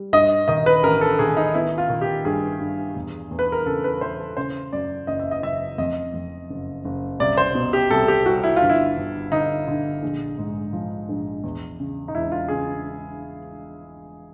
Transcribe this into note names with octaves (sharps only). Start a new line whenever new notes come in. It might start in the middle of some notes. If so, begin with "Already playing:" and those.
Already playing: G3
G2 D#5
D#3 D#5
B4
A1 A#4
A4
D#3 G#4
D#4
B3 E4
F4
D#3
G4
G2 G#4
G2
E2
E2
B4
A#4
C#3 A4
B4
E3 C5
A4
C#3 C5
F#2 D5
F#1 D#5
E5
D#5
F#1 E5
F2 D#5
F2
F#1
F#1
C2 D5
C5
B2
G4
C2 A4
G4
G3 F#4
E4
F4
G1
E4
G1
D3 D#4
D3
A#1
G#2
F3
A#1
E2
C#3
D#4
E1 E4
F4
C#3 G#4